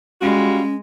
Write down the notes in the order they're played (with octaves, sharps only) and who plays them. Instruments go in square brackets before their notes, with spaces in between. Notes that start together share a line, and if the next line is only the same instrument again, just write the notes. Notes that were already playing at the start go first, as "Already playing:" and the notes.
[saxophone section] G3 F4 F#4 [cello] G#3 [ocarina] C#4